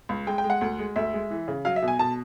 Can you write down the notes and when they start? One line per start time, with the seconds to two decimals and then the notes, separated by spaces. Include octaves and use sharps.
0.09 C#2
0.27 G#3 G5
0.38 G5
0.44 G#3
0.50 F#5
0.61 D2
0.79 G#3
0.96 D2 E5
1.13 G#3
1.31 E3
1.48 C#3
1.65 F#3 F5
1.76 E5
1.82 B2
1.88 G#5
1.99 B2 A5